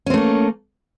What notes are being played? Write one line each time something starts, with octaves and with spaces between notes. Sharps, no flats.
A3 A#3 C4 C#4